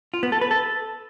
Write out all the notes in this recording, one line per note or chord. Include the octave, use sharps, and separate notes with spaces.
F4
B3
A4
B4
A4